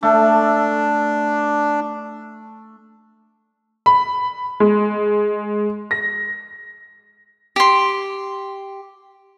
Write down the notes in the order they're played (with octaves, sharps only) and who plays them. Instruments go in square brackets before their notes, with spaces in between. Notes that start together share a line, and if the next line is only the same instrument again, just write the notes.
[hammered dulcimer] A3 [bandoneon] D4
[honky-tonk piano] B5
G#3
A#6
[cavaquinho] G4 C6